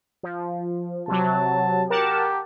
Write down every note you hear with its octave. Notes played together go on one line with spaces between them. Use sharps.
F3
C3 F#3 A5
G4 A#4 F#5 A5